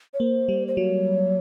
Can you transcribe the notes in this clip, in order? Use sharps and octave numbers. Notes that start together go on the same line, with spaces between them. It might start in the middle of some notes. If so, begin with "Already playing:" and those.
C#5
A#3 C5
G3
C5
F#3 C#5